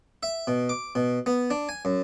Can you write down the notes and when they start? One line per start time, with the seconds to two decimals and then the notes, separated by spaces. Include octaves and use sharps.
0.23 E5
0.47 B2
0.69 D6
0.95 B2
1.26 B3
1.50 D4
1.69 G#5
1.85 F#2